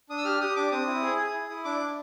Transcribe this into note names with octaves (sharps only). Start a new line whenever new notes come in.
D4 D#6
E6
G4 F6
G4 D#6
D4 D6
C4 D#6
E4
G#4
G#4
E4
E4
D4 D6
D4